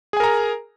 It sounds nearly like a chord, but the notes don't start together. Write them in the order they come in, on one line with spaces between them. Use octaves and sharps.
G#4 G#5 A#4 A#5